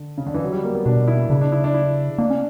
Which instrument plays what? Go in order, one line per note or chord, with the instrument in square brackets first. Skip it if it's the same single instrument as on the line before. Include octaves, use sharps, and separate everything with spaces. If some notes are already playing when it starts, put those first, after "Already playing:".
Already playing: [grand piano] D3
C#3
D3
E3
F#3
G3
A#3
B3
[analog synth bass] B2 [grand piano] D4
[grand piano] E4
[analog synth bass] C#3 [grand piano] D4
[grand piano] D4
E4
D4
E4
[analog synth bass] A#3 [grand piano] D4
[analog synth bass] C#4